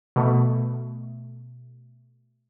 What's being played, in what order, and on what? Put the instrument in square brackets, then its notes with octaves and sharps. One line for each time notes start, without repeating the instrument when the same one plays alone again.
[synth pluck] B2 A3